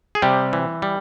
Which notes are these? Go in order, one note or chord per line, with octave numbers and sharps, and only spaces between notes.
G#4
C3 G3 G4
E3
G3